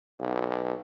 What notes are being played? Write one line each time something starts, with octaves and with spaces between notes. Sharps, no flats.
B1